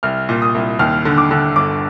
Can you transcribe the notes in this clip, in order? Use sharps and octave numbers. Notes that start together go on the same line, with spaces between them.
C2 F6
A#2
D#6
C2
D#2 F6
D3
D6
D3
G1 D6